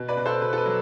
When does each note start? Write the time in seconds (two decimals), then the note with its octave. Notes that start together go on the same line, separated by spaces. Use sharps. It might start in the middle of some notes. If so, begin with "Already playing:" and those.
Already playing: B2
0.08 B4 D5
0.17 B2
0.26 A4 C5
0.42 B2 B4
0.53 A4
0.58 B4
0.66 F#3